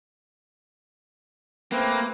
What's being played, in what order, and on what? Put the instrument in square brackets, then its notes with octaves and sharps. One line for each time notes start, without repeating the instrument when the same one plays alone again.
[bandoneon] A3 C4 B4 [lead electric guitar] A#3